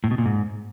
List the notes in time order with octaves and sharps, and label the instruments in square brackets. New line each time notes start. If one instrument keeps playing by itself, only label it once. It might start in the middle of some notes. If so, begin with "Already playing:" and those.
[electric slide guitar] A2
B2
A#2
G#2